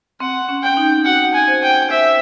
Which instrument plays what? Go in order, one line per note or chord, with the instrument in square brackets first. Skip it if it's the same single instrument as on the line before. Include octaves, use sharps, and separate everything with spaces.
[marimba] C4 [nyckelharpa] F#5
[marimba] C#4
[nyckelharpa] G5
[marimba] D#4
[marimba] F#4 [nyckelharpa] F#5
[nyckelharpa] G#5
[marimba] C5
[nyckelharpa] G5
[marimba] C5 [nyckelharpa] E5